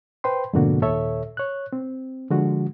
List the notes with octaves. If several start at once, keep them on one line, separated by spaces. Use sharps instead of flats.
B4 C5 G5 C6
F2 G#2 B2 D3 A#3 F#4
D#2 A#2 A4 C#5 E5
C#5 F#6
C4
D3 F3 G#3 F#4